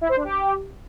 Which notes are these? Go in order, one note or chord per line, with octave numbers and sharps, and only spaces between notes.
E4
C5
D4
G4